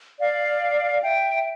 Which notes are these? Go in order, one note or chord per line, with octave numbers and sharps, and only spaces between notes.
D5 F5
E5 G5